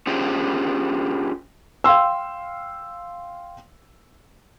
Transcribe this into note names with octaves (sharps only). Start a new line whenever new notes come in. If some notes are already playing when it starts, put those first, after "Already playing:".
C#4 D4 F4 G4 G#4 C5
F5 G5 C6 E6